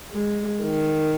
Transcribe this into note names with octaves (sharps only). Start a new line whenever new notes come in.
G#3
D#3